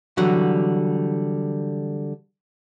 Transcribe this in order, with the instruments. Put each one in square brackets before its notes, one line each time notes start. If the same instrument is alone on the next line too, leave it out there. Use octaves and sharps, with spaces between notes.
[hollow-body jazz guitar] D3 E3 F#3 G3 F#4